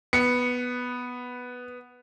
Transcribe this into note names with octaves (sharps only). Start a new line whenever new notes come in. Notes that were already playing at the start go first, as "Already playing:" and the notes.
B3 C#7